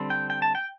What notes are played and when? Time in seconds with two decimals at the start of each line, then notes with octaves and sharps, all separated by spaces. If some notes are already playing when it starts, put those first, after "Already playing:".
Already playing: D3 G3 C4
0.10 G5
0.30 G5
0.42 A5
0.55 G5